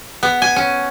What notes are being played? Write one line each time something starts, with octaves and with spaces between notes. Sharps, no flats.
B3
G#5
C#4